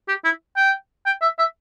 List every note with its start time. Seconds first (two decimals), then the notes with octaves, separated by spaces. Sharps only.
0.08 G4
0.25 E4
0.57 G5
1.06 G5
1.22 E5
1.39 E5